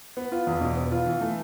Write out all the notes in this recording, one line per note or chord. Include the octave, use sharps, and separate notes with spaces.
B3
F4
E2
B2
B3
F4
E3
A3